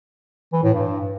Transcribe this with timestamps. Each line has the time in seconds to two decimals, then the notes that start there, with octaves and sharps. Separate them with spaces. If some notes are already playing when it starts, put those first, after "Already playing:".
0.53 E3
0.63 A2
0.73 G2